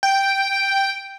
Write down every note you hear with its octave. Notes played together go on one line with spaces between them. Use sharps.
G5